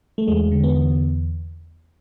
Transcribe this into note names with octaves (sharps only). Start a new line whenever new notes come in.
A3
E2 G#3
D3
B3
E2